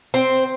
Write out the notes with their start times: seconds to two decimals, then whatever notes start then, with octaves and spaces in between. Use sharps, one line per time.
0.14 C4